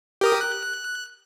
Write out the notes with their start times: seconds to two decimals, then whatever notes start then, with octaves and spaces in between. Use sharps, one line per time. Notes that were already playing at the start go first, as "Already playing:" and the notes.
0.21 G4 A#4 D#6
0.41 F#6